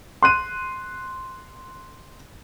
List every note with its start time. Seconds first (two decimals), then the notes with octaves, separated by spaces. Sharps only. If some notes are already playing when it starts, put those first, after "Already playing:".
0.23 C6 F#6 D#7